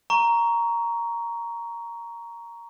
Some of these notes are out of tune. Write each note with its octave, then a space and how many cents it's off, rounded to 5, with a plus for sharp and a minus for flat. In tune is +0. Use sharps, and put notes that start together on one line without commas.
A#5 +0 C#6 +20